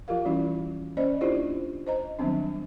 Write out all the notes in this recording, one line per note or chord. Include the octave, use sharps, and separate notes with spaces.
F3 F4 G4 A#4 F5
E3 G3 C#4 E4 F#4
A#3 C#4 C5 D5 D#5
D4 E4 F4 G4 C5 D5
C5 D#5 A#5
D#3 F#3 G3 B3 C4 D4